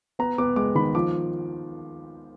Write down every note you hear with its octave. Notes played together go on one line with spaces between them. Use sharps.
B3 A#5
B3 D6
G#3 D6
D#3 B5
F3 D6